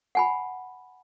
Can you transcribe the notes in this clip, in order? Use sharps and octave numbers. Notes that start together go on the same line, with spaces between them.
F#5 G#5 B5